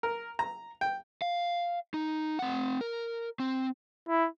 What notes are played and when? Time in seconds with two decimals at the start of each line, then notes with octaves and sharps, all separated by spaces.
0.03 A#4
0.39 A#5
0.81 G5
1.22 F5
1.94 D#4
2.39 C4 F#5
2.81 A#4
3.40 C4
4.08 E4